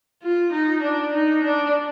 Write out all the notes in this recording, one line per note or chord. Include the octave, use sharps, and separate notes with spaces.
F4
D#4
D4
D#4
D4